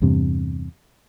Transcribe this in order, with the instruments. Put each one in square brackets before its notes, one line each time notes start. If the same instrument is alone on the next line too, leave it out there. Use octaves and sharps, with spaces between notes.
[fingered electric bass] E2 G2 C3